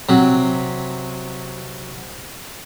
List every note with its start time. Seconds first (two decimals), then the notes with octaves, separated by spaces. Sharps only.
0.09 C3 F#3